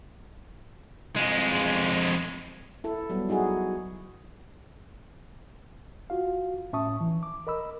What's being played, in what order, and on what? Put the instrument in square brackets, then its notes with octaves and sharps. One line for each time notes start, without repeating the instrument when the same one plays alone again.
[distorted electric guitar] F2 G#3
[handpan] E4 A4
F#3 G3 B3
D#4 E4 F#4 G#4
[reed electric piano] F4 F#4 F5
A2 C#4 E5 A5 C#6 D#6
E3
D6
A#4 D#5 B5 E6